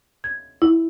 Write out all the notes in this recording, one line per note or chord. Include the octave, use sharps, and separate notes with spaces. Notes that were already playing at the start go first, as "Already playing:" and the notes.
G#6
E4